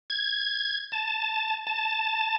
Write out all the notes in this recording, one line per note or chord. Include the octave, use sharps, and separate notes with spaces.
G#6
A5
A5